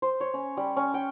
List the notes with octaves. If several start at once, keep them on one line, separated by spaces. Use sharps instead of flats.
C5
C#5
C#4
G3
C#4
G5